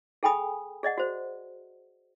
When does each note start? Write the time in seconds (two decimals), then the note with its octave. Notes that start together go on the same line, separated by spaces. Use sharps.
0.23 G#4 A4 G5 G#5 B5 D#6
0.83 G#4 D5 D#5 F#5
0.98 F#4 C5